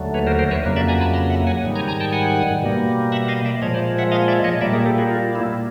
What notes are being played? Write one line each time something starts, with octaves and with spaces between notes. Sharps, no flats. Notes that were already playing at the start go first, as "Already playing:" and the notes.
Already playing: D#2 D3 F#3 A3
B4 C#5
A#4 C5
A#4 C5
B4 C#5
F2 C#3 F#3 A#3
D5 E5
G#5 A#5
A5 B5
A#5 C6
E5 F#5
F#5 G#5
G#2 D#3 G3
G#5 A#5
G#5 A#5
G5 A5
F#5 G#5
B2 G3 A#3
E5 F#5
D#5 F5
D5 E5
A#2 F3 G#3 C#5 D#5
C5 D5
E5 F#5
D#5 F5
D5 E5
C#5 D#5
A#2 G3 A#3 D5 E5
G#4 A#4
G4 A4
F#4 G#4
F4
E4